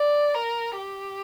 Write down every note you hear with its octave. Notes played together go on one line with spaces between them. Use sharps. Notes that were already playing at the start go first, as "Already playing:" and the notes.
Already playing: D5
A#4
G4